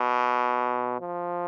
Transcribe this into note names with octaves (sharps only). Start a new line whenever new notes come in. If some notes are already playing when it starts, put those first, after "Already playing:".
Already playing: B2
F3